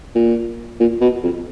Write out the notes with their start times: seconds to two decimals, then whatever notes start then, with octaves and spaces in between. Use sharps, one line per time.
0.15 A#2
0.80 A#2
1.01 B2
1.23 F2